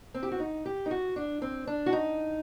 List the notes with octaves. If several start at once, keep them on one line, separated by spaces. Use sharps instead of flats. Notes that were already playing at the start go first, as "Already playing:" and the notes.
C4
G4
F#4
D#4
G4
D#4
F#4
D4
C4
D4
F#4
D#4